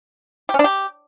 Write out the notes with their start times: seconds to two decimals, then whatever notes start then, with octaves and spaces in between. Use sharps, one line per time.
0.49 G4
0.54 C#4
0.59 D4
0.64 G4